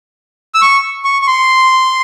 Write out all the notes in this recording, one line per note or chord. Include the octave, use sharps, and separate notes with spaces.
E6
C#6
C#6
C#6
C6